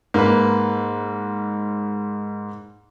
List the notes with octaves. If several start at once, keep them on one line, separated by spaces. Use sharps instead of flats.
G#2 A#3 B4